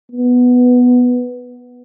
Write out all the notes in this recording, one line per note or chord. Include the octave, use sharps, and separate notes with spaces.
B3